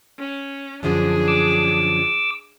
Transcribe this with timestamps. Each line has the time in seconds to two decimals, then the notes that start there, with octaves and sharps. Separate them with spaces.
0.18 C#4
0.83 F#2 D3 F3 D4 G#4
1.28 D6 E6